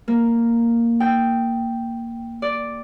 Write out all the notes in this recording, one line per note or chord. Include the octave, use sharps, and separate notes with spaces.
A#3
G5
D5